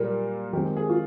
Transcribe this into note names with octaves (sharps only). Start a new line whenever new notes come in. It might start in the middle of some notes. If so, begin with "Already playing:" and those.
Already playing: A#2 G3 A#3 A#4
D#3 G#3 C4 G4
G#4
F4